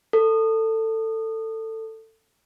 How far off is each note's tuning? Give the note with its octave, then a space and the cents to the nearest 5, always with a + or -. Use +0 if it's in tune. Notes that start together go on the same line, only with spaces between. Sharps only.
A4 +20